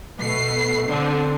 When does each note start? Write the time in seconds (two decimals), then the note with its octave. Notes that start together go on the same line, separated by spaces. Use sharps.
0.19 B2 A3 C7
0.88 D3 C4 D4